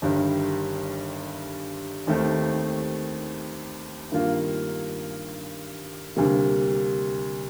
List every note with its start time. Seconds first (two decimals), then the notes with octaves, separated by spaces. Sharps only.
0.02 G1 G2 D#3
2.07 D#2 D#3 A3 C4
4.12 G2 D#3 A#3 F4
6.16 D2 C3 G3 A#3